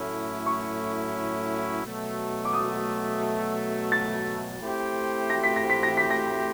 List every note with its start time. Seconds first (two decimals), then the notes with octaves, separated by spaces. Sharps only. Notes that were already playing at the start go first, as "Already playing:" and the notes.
Already playing: A2 F#3 A3 C#4 E4
0.46 C#6
1.84 B2 F#3 A3
2.45 D6
2.53 D#6
3.92 A6
4.61 A3 C4 E4 G4 C5
5.30 A#6
5.44 B6
5.56 A#6
5.70 B6
5.83 A#6
5.97 B6
6.10 A#6